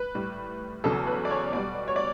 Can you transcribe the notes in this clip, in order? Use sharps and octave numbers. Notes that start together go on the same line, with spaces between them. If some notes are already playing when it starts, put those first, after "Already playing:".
Already playing: B4
A2 G3
E2 C#3 F#3 A4
B4
D5
C#5
B2 G3 D5
C#5
D5